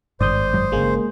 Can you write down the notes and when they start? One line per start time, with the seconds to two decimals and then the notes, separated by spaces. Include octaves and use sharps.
0.20 G#1 G2 D#3 C5 D5 D#6 G6
0.53 F#2 F#3 G#3
0.72 G1 C#3 G#3 A#3 G#4